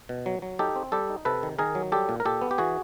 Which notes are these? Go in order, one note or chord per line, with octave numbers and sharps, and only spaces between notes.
B2
F#3
F#3
D#4 G4 A4
C4
G3 G4 A4
D#4
C3 A4 B4
D#3
D#3 G#4 A#4
F#3
G3 G4 A4
A#2
A#4
A#2 G4 A4
B3
G4
E3 F#4 G#4